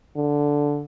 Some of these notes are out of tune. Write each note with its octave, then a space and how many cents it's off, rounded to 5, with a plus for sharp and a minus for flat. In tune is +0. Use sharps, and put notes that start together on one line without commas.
D3 -5